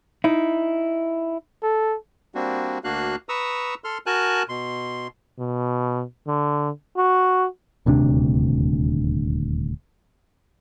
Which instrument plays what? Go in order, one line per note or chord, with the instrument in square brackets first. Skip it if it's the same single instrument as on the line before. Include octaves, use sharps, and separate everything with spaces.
[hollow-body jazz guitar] D#4 E4
[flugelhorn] A4
[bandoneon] G3 A#3 C4 D4 F#4
D2 A#3 D4 F#4 F5 F#6
B4 A#5 C#6 D#6 E6
A4 C6 F6
F#4 A#4 G#5 A5 F#6
B2 C6
[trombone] B2
D3
F#4
[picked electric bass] D#1 D2 C3 D4